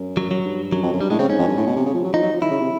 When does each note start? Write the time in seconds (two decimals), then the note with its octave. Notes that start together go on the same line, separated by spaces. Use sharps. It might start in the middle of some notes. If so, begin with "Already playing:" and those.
Already playing: F#2
0.17 F#3
0.31 F#3
0.45 G2
0.72 F#2 F#3
0.83 F2
0.92 F#2
1.01 G2 G3
1.10 A2 G#3
1.19 C#3 C4
1.29 G#2 C#4
1.39 F2
1.48 G2
1.57 A2
1.67 B2
1.76 C3
1.86 C#3
1.94 F3
2.04 F#3
2.13 F3 D#4
2.22 F#3
2.32 F3
2.41 D#3 E4
2.51 C#3
2.61 C3